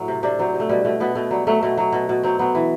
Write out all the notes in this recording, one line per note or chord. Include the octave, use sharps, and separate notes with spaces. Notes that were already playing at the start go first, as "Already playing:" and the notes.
Already playing: A2 F#3 C4
C3
C3 D4
F#3 C4
C3
A3
B2 G3
B2 A3
B2 B3
B2 A3
F#3 G3
F#3 A3
B2 A3
F#3
B2
B2
F#3 C4
F#3 B3
E3